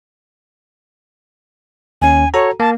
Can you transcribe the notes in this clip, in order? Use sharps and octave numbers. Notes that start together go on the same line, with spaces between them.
D#2 C#4 G#5
F#4 A4 C#5 A#5
A#3 A5